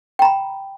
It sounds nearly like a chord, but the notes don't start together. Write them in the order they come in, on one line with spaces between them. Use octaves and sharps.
G5 A#5 B5